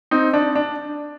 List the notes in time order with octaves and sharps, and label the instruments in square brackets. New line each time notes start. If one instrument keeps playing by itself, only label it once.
[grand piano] C4 D#4
D4
D4